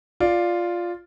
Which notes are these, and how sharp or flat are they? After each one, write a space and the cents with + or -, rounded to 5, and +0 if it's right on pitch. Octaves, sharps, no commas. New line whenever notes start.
F4 +0 D5 +0